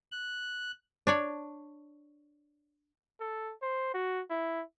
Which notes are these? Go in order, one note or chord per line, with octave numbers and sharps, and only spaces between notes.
F#6
D4 C#5 D5
A4
C5
F#4
E4